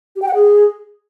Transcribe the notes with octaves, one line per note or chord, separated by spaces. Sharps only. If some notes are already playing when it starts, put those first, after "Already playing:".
G4
G5
F#5
G#4